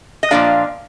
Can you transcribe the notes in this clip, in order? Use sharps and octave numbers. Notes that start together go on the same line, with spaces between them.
D#5
A#2 F3 A#3 D4 D5 F5